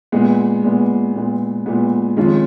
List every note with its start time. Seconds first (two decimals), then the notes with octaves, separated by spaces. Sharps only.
0.12 A#2 G#3 B3
0.63 A#2 G#3 B3
1.15 A#2 G#3 B3
1.66 A#2 G#3 B3
2.17 F2 D#3 G#3 C#4 F4